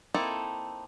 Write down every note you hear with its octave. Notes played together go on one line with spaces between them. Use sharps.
A#3 C4 D#4 E4 A4